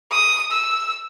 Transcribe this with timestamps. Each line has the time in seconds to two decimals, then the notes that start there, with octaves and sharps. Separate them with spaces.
0.11 D#6
0.51 E6